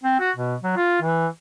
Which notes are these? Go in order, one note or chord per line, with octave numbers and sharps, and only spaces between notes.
C4
F#4
B2
F#3
F4
E3